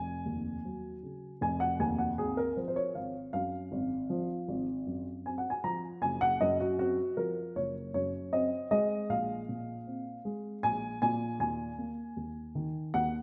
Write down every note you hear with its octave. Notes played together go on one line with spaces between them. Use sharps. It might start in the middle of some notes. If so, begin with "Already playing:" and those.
Already playing: F1 G#5
D#2
F#3
C#3
F1 G#5
F#5
D#2 G#5
F#5
G#1 G#4
A#4
F3 C5
C5
C#5
G#1 F5
F#2 F5
G#1
F3
G#1
F#2
C4 G#5
F#5
G#5
F3 A#5
F#1 G#5
F#5
F#2 D#5
F#4
C4 F#4
F3 A#4
F#1 C#5
F#2 C#5
C4 D#5
G#3 D#5
A#1 F5
A#2
C4
G#3
A#1 G#5
A#2 G#5
D#2 G#5
A#3
D#2
D#3
D#2 F#5